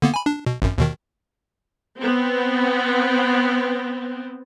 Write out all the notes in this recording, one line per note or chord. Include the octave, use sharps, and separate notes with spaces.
D3 A#3 B3
G#5 B5
D4
B2
G#1 F#2
D#2 B2 D#3
B3 C4